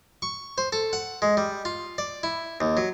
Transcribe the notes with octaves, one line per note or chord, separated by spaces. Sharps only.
C#6
C5
A4
F#5
G#3
G3
F4
D5
E4
D#2
F#3